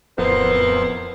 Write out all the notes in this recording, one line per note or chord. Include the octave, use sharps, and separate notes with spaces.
D1 F2 B3 E4 A#4 C5